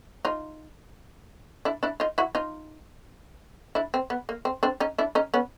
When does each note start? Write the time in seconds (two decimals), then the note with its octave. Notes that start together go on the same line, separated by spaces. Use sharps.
0.25 D#4 F4
1.65 D4 E4
1.83 D4 E4
2.00 D#4 F4
2.18 E4 F#4
2.35 D#4 F4
3.75 D4 E4
3.94 C4
4.10 B3
4.29 A#3
4.45 C4
4.63 C4 D4
4.80 C#4 D#4
4.98 D4 E4
5.15 C#4 D#4
5.34 B3 C#4